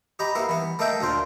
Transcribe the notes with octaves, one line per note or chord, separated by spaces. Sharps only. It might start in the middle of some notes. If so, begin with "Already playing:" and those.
G4 D#5 A#5 B5
A#3 B3 E4
E3 B3
A3 A#3 D#5 E5 G5
D2 A#2 F4 C5